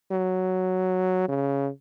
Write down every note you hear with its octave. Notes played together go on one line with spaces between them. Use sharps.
F#3
C#3